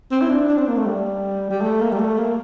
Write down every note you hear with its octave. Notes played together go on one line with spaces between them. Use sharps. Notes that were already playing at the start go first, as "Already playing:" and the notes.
C4
E4
D4
D4
C4
A#3
A3
G3
G3
A3
A#3
G3
A3
A#3